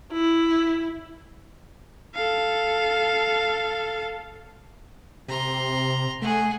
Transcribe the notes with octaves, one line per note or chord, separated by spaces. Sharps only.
E4
A4 F5
C3 A#5 C6
A3 G#4 F#5